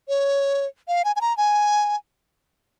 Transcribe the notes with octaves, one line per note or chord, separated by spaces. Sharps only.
C#5
F5
G#5
G#5
A#5
G#5